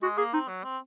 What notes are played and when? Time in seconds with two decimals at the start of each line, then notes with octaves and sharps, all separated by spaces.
0.02 G#3 F#4
0.18 A#3 G#4
0.34 C4 D#4
0.49 F#3
0.64 C4